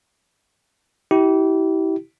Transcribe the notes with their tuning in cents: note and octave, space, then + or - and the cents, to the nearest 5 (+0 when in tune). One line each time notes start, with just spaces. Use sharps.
E4 -30 G4 -30